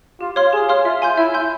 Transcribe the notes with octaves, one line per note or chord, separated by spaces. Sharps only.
F4 G4
C#5 F5 C6 F6
G4 G#4
C#5 F5 C6 F6
F4 E5
G#5 C6 G6
E4 E5
G#5 C6 G6